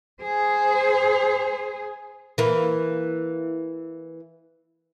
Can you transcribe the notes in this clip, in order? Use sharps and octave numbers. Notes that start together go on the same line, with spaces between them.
G#4 C5
E3 A#3